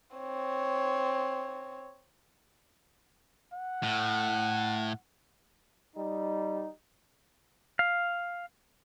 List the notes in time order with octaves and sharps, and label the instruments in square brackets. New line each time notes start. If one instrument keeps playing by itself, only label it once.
[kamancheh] C4 C#5
[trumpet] F#5
[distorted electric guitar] A2
[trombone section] G3 D#4
[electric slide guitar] F5